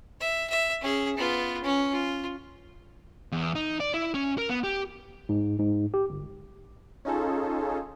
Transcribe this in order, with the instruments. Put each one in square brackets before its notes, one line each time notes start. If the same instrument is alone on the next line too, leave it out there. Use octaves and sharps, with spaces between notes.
[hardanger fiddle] E5
E5
C#4 G#4
B3 F4
C#4
F4
[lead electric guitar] E2
D#4
D5
E4
C#4
A#4
B3
G4
[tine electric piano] G#2
G#2
G4
G1
[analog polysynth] C#4 D#4 F4 G#4 A4